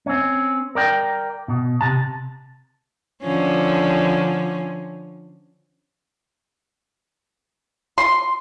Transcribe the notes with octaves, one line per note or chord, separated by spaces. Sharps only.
C4 C#4
A#4 D5 G5
B2
C3 A5
D3 F3 C#4
C6